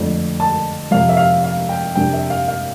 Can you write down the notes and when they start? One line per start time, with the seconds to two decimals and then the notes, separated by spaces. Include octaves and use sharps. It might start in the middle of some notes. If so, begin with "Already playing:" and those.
Already playing: F2 D3 A3 D4
0.40 A5
0.91 F2 C3 F3 F5
1.09 E5
1.17 F5
1.44 F5
1.69 G5
1.95 F2 C3 G3 A#3 D4 G5
2.13 E5
2.30 F5
2.48 F5